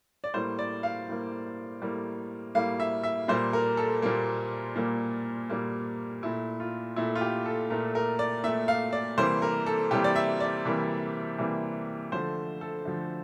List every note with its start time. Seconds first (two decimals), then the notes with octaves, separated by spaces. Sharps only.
0.24 D5
0.34 A2 G3 A#3 C5
0.59 D5
0.83 F5
1.08 A2 G3 A#3
1.82 A2 G3 A#3
2.55 A2 G3 A#3 F5
2.80 E5
3.03 E5
3.28 A#2 G3 A#3 C5
3.53 A#4
3.77 A4
4.02 A#2 G3 A#3
4.76 A#2 G3 A#3
5.49 A#2 G3 A#3
6.23 A#2 A3 E4
6.60 F4
6.96 A#2 A3 E4
7.15 F4
7.21 G4
7.46 A4
7.70 A#2 A3 A#4
7.95 A#4
8.19 D5
8.44 A#2 A3 E5
8.68 F5
8.93 D5
9.18 C3 E3 G3 A#3 C5
9.42 A#4
9.66 A4
9.91 C3 E3 G3 A#3 G4
10.04 D5
10.16 E5
10.40 D5
10.65 C3 E3 G3 A#3
11.38 C3 E3 G3 A#3
12.12 D3 F3 A3 C5
12.61 A4
12.85 D3 F3 A3